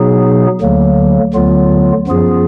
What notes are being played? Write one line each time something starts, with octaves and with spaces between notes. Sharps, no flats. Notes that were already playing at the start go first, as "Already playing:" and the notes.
Already playing: B2 F#3 B3 D#4 G#4
D2 D3 F#3 A#3
D2 D3 F#3 B3 F4
F#2 F3 B3 F4 G#4